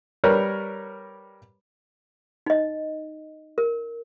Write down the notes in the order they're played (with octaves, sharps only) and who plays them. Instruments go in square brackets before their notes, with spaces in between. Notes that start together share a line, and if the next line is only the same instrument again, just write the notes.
[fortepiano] G3 A#4 B4 C#5
[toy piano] D#4 D#5
A#4